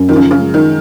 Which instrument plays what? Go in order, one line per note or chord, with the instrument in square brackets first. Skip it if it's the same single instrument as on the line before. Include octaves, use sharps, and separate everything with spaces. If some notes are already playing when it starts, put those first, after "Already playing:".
Already playing: [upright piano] F#2
[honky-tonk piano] D#3 [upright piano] F3
[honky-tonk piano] C#3
C#3
[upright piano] G#3
[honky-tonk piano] D#3